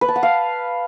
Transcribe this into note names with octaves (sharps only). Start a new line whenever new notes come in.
B4
A5
F#5
F5